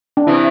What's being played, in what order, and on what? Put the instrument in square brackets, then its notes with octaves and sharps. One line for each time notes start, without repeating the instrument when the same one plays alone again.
[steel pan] D4
[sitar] C3 E3 [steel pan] E4